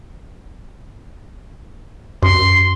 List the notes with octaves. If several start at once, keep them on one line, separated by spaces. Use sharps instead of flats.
F#2 C6